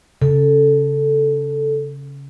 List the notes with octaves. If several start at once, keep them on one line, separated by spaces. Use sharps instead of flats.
C#3 A4